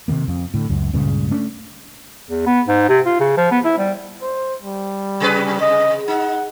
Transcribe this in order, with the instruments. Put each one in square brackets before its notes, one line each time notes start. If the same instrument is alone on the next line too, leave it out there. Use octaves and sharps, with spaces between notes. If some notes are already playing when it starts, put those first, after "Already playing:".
[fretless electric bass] C3 D#3 G3 A#3
F2
A2 D3
C#2 F#2
C#2 G2 A#2 C#3
A3 C#4 D4
[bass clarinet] E2
B3
G#2
C3
F4
C#3
F3
B3
E4
G3
[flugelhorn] C5
G3
[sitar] C3 G#4 B4
[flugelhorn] D#5
[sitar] D#4 [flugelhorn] F#5